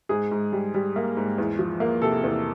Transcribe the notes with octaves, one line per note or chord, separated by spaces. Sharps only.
G#2 G#4
G#2
G3
G3
A#3
G#2
E2
F3
A#3
C3 A4
E2